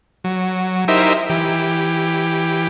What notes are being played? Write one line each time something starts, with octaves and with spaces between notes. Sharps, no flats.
F#3
D#4 E4 G4 A#4 C5 E5
E3 G4